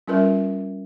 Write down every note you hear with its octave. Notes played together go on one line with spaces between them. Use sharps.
G3 C#4 F4 A#4 B4 E5